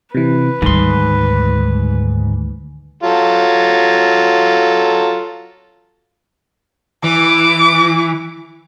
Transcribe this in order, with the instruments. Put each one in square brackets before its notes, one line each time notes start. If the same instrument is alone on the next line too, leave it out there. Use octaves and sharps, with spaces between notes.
[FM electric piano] C3 E3 [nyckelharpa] B4
[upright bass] D2 G3 [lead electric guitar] G#2 C6 [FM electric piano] D#3
[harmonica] F#3 F4 A4
[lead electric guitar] E3 [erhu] D6